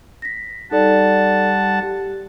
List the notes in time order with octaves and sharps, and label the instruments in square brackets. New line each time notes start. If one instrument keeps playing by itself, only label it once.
[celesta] A#6 B6
[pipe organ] G3 F#5 A5 [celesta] D#4 A4 D5
[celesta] G4